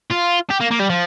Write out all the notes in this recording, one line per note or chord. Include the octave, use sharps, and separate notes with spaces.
F4
G4
A#3
A#3
G3
F3